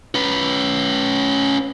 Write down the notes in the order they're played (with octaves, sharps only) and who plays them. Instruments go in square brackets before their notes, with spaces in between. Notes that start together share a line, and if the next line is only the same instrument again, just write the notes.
[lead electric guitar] C#4 B4